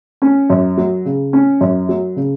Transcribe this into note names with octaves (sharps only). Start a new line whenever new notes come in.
C#4
F#2
F#3
C#3
C#4
F#2
F#3
C#3